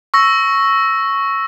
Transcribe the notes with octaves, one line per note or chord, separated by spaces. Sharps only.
C#6 E6 A#6